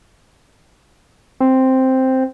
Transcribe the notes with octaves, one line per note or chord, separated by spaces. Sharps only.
C4